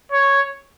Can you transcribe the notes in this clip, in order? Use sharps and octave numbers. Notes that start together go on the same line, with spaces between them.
C#5